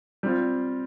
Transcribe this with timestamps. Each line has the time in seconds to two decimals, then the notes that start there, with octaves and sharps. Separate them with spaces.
0.23 G3 C4 F4